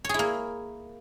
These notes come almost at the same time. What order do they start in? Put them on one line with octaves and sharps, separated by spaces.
C#5 G#4 E4 A#3